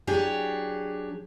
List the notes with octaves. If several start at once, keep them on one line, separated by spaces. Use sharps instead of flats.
F#3 D4 G4 G#4